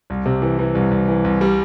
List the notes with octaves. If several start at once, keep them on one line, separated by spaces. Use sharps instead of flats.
C2
C3
E3
E3
C2
C2
E3
C2
G3